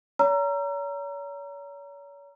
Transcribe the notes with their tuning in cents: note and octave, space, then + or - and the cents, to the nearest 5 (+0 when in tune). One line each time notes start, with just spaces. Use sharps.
C#5 +40 A#5 +0 E6 +45